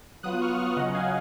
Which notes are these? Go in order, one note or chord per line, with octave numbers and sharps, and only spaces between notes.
F#3 B3 F4 D#6 F#6
C#6 F6
C#6 F6
C#3 F#3 C#4 D#5 F#5
F5 G#5